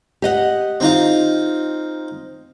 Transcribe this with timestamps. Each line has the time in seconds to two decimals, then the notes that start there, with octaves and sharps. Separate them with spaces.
0.22 G4 D#5 F#5
0.80 C4 D#4 F4